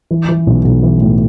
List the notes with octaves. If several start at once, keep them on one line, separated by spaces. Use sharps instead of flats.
E3
E3
B1
B1
E3
A2